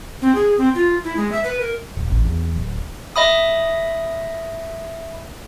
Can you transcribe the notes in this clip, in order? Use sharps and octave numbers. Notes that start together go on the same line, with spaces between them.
C4
G#4
C4
F4
E4
G#3
E5
B4
A#4
D#1
A1
E2
D1
D#5 E5 B5 D#6